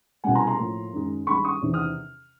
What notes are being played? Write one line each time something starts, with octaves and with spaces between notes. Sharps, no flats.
C2 B2 G3 F#5 G#5
G#5 A#5
A#5 C6
A2 F3 A#3
F#2 D#3 G#3
G2 D#3 G3 B5 C#6
C#6 D#6
E2 C3 D#3
D#6 F6